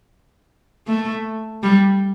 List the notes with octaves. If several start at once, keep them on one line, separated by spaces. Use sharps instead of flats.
A3
G3